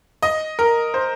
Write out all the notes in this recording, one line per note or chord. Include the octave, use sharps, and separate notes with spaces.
D#5
A#4
C5